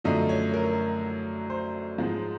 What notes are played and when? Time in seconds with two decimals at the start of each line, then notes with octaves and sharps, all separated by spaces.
0.04 F#2 D3 F3 A3 D#5
0.29 C#5
0.54 A#4
1.50 C5
1.98 G#2 F3 G#3